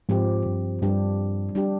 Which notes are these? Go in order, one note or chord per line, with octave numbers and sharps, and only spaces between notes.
G#2 F3 C4 G4
G2
G2 G3 D4 G4
G3 D4 G4